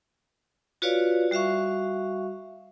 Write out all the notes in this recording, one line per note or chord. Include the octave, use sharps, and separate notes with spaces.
F4 F#4 B4 C#5 D5 F5
G3 F#4 E5 F5 C#6